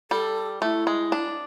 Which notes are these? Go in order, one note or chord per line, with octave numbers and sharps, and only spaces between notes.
G3 A4
A3 E4
G#3
D4